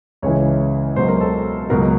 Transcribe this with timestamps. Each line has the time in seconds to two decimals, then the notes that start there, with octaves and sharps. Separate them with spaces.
0.22 C#2 C#3 E3 C#5
0.96 C#2 B2 F#3 C5
1.08 A#4
1.21 A4
1.70 C#2 B2 F#3 A#4